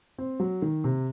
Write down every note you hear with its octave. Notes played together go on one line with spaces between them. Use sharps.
C4
F#3
D#3
C3